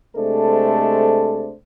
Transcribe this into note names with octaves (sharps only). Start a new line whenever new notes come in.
C3 G#3 A3 D4 A4 C5